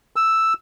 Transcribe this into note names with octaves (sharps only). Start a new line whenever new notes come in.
E6